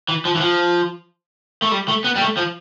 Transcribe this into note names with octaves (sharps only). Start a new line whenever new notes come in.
E3
F3
E3
F3
A3
G3
A3
B3
G3
A3
F3